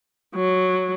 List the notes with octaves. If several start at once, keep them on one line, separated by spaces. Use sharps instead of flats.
F#3